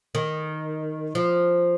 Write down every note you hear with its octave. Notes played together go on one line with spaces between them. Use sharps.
D#3
F3